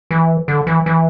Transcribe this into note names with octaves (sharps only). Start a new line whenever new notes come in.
E3
D3
E3
E3